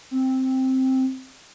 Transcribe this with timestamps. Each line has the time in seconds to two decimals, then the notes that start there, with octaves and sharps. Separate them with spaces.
0.11 C4